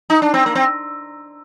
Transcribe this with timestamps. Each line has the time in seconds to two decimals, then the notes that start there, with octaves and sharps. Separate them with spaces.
0.10 D#4
0.22 D4
0.34 C4
0.46 A#3
0.55 C4